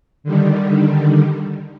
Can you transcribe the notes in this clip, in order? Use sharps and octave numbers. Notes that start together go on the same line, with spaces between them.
D3 D#3 G3